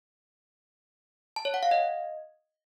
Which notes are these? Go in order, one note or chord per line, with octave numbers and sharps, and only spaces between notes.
A5
C#5
F#5
F5
D#5